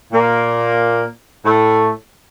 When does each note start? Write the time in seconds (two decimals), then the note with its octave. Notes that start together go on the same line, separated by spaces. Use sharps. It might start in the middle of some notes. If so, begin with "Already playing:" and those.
0.12 A#2 A#3
1.45 A2 A3